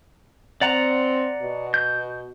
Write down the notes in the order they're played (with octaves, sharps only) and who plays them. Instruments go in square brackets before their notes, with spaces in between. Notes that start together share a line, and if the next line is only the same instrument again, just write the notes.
[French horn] C4 [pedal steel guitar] D5 F#5 A#5
[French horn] B2
[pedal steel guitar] G6